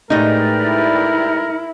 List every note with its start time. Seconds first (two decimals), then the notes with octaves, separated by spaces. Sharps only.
0.10 A2 G#3 A3 D#4 G4 A#4 B4 D5
0.64 E4